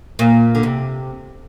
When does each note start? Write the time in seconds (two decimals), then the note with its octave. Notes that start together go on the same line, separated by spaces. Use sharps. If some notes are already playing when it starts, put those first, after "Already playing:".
0.19 A#2
0.55 D3
0.63 C3